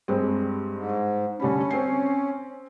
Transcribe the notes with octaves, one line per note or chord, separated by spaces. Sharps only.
G2 G#3 C4
G#2
D3 G3 C#4 B5
C4 C7